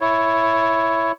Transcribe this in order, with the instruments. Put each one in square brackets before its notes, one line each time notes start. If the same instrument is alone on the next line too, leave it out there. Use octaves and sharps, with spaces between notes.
[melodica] E4 C#5